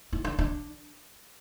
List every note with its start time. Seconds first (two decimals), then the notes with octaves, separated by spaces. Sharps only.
0.13 E4
0.24 D4
0.38 D4